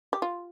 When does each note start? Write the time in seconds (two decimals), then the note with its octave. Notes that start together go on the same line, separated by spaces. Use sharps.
0.13 G4
0.22 F4